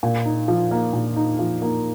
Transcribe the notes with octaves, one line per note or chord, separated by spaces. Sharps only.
A#2
D#4
F3
A#3
A#2
D#4
F3
A#3